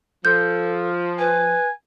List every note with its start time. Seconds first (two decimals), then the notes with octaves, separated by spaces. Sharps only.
0.25 F3 A4 G6
1.19 B4 G#5